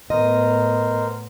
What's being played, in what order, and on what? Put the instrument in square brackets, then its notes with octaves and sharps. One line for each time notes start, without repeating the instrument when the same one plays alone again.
[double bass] A2 B3 [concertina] A#4 C5 [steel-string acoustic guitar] D#5